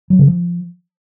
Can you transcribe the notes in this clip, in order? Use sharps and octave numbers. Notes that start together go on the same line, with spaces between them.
F#3
C#3
F3